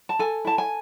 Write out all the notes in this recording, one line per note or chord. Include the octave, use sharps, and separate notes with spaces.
A5
A4 G#5
E4 A5
G#5